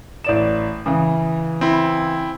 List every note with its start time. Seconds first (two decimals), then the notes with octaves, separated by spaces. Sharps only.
0.24 A1 D5 E7
0.86 C#3 E3
1.61 C4 E4